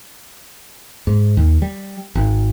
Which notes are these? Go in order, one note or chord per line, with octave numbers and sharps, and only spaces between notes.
G#2
D#2
G3
G#1